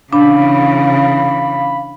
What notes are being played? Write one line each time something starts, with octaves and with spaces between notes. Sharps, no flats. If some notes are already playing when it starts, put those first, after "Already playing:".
C#3 E3 D4 F5 B5